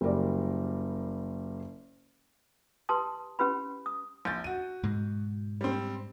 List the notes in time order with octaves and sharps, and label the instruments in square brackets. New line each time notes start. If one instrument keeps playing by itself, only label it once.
[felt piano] F#1 G3 A#4 D5
[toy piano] G4 B4 A5 C6 D#6
C#4 G4 B4 B5
D#6
[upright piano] A#1 G6 A6
F#4 D#7
[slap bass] G#2 B2 G#3
[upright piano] G3 C4